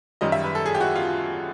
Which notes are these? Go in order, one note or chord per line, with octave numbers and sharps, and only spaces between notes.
F#2 D#3 G3 D#5
E5
B4
A4
G#4
G4
F#4
F4